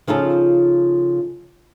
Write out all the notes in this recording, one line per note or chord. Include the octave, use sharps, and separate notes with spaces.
C#3 F3 D#4 F4 A4